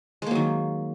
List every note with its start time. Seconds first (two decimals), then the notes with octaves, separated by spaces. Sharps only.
0.22 G#3
0.26 A#3
0.31 F#3
0.35 D#3